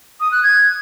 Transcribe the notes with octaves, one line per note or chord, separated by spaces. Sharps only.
D#6
F#6
G#6